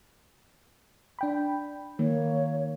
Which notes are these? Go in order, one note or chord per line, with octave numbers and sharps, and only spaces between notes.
D4 G5 B5
D#3 A#3 C#5